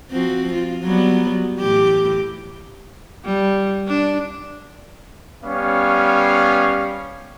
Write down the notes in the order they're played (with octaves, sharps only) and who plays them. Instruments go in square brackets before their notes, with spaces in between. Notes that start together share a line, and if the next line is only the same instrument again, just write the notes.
[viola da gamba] F3 C4 F#4
F4
F#3 G3 B3
A2 E3 G4
G3
D4
[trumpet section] G3 B3 C#4 C#5 F5